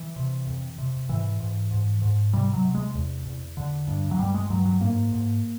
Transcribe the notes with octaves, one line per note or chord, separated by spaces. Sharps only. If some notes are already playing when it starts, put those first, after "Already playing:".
Already playing: E3
C3
F2
C3
G#2 E3
G#2
G#2
G#2
C3 G3
F#3
C3
G#3
E2
E2
D3
G2
F#3
G2 G3
G#3
G2 F#3
F#3
G#2 A#3
G#2